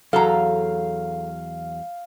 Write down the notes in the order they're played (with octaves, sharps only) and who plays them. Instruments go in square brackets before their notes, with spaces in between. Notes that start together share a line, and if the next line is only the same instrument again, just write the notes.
[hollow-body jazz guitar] E2 F#3 [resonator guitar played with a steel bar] A4 A#5 [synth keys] F5